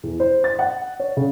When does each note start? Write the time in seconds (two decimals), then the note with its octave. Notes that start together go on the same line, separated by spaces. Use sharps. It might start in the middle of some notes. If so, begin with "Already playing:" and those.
0.03 E2
0.20 C5
0.44 A6
0.59 F#5
1.00 C#5
1.17 C#3